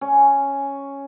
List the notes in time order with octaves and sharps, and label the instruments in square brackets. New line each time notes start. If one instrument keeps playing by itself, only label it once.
[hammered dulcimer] C#4